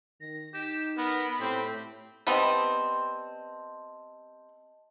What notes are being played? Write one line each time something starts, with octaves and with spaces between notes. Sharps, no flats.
D#3 A#6
D#4 G4 E7
B3 A#4 B5
A2 C4 G4
G3 B3 C4 D#5 A5